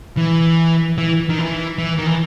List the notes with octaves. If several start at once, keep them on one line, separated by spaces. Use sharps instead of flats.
E3
E3
D#3
E3
E3
D#3
E3